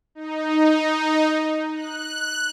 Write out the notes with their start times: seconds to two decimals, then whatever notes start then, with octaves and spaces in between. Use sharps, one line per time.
0.15 D#4
1.75 F#6